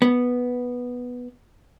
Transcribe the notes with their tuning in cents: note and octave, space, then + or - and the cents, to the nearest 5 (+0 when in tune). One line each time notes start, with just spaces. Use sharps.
B3 -5